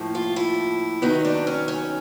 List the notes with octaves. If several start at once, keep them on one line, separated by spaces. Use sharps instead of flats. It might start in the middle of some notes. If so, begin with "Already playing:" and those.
Already playing: A2 F3 A#3
F4
E4
D#3 F#3 B3 D#4
D4
C#4
C#4